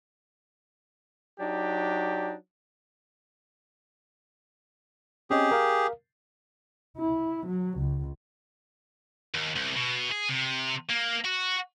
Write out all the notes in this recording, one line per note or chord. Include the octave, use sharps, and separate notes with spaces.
F#3 D4 D#4 G4
C4 C#4 G4 G#4 D#5
A#4 F5
E4
F#3
C#2
D#2
C2
B2
G#4
C3
A#3
F#4